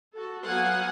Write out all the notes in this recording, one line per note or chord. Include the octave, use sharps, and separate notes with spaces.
F#4 A4
F#3 B3 F5 F#5 G#5